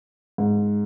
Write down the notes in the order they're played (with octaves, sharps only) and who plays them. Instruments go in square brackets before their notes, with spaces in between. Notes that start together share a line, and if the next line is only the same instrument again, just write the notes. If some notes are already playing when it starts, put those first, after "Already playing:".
[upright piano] G#2